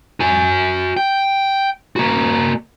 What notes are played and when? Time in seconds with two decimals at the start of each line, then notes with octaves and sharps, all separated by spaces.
0.20 F#4 G#5
0.97 G5
1.96 A#3 F#4